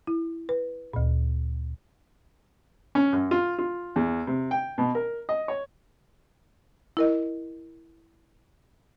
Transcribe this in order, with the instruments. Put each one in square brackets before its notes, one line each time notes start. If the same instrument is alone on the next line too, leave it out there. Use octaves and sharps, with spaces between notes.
[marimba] E4
B4
D2 A#2
[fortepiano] C#4
F#2
F4
F4
E2
C3
G5
B2
A#4
D#5
C#5
[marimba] E4 A#4 D#5